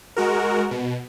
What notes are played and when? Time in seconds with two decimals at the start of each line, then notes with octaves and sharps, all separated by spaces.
0.17 G#3 F#4 A#4
0.71 B2